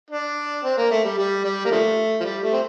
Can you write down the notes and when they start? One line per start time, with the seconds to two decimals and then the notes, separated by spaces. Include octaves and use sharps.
0.11 D4
0.65 C4
0.78 A#3
0.91 A3
1.04 G3
1.18 G3
1.45 G3
1.65 A#3
1.71 D3 F3 A3
2.20 F3
2.25 G3
2.42 A3
2.53 C4